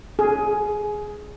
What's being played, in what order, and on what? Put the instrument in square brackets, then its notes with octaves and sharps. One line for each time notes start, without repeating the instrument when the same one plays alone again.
[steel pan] G#4